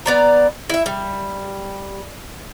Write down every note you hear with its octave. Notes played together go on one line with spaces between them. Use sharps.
B3 D5 A#5
E4 E5
G3